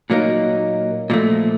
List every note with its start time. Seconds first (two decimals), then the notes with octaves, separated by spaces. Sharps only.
0.10 A#2 F#3 A#3 D#4
1.10 A#2 F3 A3